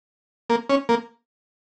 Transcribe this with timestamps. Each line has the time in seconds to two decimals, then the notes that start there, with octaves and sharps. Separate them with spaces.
0.50 A#3
0.69 C#4
0.89 A#3